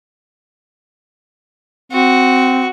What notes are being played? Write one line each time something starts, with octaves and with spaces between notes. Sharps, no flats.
C4 F#4